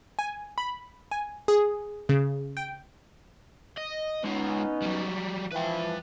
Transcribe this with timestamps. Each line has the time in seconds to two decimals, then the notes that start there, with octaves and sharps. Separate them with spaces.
0.19 G#5
0.58 B5
1.11 G#5
1.48 G#4
2.09 C#3
2.57 G5
3.77 D#5
4.24 G#3 B3 C#4 D#4 F4
4.82 F#3 G3
5.52 E3 F3 B4 G5